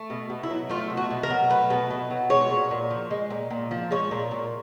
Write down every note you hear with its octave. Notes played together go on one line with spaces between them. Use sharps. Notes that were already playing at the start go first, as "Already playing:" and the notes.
Already playing: A3
B2
B2
E4
F#3
A3 F4
B2
F#4
B2
A#4
F#3
A3 B4
B2
B2
F#3
G#3 C#5
A#2
A#2
F3
G#3
A#2
A#2
F3
G#3 C#5
A#2
A#2